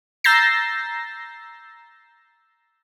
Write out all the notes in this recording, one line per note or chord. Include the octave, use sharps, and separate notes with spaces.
A#5 E6 G6 A6 A#6 C7